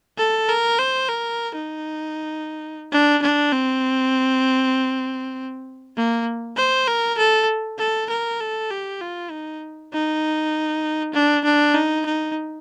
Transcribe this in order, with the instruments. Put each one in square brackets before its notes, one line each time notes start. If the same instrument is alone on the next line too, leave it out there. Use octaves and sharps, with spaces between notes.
[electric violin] A4
A#4
C5
A#4
D#4
D4
D4
C4
A#3
C5
A#4
A4
A4
A#4
A4
G4
F4
D#4
D#4
D4
D4
D#4
D#4